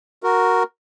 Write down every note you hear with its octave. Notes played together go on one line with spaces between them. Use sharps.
F#4 A#4